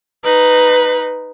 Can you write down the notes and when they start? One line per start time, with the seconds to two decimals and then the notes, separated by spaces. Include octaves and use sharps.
0.24 D#4 B4